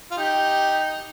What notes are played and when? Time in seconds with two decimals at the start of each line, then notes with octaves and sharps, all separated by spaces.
0.11 F4
0.17 D#4 G4